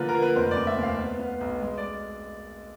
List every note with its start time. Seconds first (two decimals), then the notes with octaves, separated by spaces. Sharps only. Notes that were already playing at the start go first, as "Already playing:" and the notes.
Already playing: D3 F3 A#3 B4
0.09 A#4
0.15 A#3
0.22 B4
0.36 F1 C5
0.51 D5
0.57 F1
0.67 E5
0.78 D#2 F5
0.99 B3
1.19 B3
1.41 B1
1.61 G#3
1.78 D5